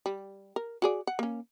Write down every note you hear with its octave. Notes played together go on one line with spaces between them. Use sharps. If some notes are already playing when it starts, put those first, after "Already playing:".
G3
A#4
F#4 G#4 D5
F#5
A#3 C#4